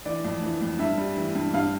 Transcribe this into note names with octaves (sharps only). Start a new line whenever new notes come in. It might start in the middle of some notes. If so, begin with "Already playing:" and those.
E3 D5
F2
E3
F2
G2 E5
G3
E3
G2
G2 F5